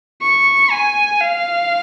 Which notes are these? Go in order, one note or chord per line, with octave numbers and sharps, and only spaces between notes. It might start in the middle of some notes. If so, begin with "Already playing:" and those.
C#6
G#5
F5